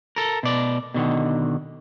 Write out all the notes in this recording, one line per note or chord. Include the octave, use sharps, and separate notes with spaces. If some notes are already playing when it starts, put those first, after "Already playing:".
A4 A#4
B2 D5
B2 D3 D#3